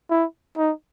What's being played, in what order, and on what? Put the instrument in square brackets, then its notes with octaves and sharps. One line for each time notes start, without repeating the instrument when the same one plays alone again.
[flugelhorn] E4
D#4